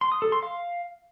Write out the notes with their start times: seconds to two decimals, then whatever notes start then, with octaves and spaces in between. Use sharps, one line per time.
0.01 C6
0.12 D#6
0.22 A4
0.32 C6
0.43 F5